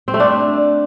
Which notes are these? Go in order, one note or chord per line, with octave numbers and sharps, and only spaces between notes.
C4
A3
D4